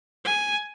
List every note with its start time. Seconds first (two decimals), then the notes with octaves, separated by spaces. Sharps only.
0.24 G#5